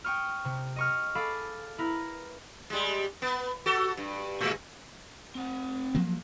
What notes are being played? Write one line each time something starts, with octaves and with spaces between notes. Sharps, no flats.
G5 C#6 D#6 F6
C3
D#5 C#6 F6
G#4 A4 F5 B5 D6
E4 A#4 B4
G3 G#3
B3
F#4 A4
G2
A2 G#3
C4 F#5
F3 F#3 A#3